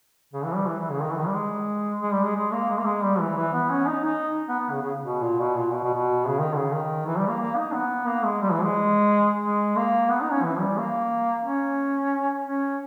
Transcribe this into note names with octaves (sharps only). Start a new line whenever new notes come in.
C#3
E3
G3
E3
E3
C#3
D#3
E3
D#3
G3
G#3
G#3
G3
G#3
G#3
A#3
G#3
A#3
G#3
G3
E3
E3
B3
C#4
D#4
D#4
B3
B3
C#3
C#3
B2
A#2
B2
A#2
B2
B2
B2
C#3
D#3
C#3
D#3
E3
G3
A#3
A#3
D#4
B3
A#3
G#3
G3
E3
G#3
G#3
A#3
B3
D#4
C#4
E3
G3
A#3
C#4
C#4